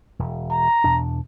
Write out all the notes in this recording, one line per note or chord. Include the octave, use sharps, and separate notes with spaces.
E1
A#5
E2 B2 D4